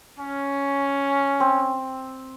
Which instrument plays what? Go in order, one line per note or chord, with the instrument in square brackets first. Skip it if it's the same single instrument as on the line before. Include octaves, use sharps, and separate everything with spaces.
[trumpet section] C#4
[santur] C4